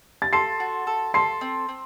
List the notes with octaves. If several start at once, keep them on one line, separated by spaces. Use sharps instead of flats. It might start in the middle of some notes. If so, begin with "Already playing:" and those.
A6
A4 C6 C7
F#4
A4
A4 C6 C7
C4
C4